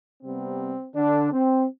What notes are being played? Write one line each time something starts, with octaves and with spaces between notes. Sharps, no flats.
C3 G3 B3 C4
D3 D4
C4